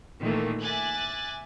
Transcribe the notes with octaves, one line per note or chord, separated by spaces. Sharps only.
A#2 D#3 E3 A3 A#3
E5 G#5 D6 F#6 A6